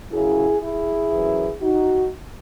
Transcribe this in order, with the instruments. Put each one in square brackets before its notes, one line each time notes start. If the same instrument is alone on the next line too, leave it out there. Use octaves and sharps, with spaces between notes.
[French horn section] F#2 C#3 F#3 E4 G#4
E4 G#4
F#2 E3
D#4 F#4